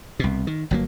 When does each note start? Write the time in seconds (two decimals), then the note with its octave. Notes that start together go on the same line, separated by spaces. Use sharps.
0.20 C2 B2
0.47 D#3
0.71 G1 F#3 A#3